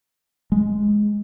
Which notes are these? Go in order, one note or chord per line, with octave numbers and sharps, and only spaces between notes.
G#3